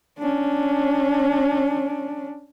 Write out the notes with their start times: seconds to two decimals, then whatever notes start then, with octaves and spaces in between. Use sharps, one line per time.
0.19 C#4 D4